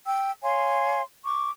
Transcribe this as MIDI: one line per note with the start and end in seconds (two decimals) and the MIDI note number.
0.06 0.30 79
0.06 0.30 88
0.42 1.02 73
0.42 1.02 77
0.42 1.02 80
0.42 1.02 84
1.25 1.50 85
1.25 1.50 86